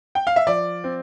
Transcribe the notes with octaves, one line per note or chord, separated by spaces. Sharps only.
G5
F5
E5
F3 D5
C4